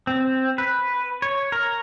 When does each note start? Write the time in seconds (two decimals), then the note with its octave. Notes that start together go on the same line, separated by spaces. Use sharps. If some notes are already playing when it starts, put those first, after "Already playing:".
0.07 C4
0.58 B4
1.22 C#5
1.52 A#4